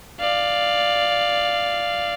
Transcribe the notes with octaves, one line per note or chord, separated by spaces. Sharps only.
D5 F5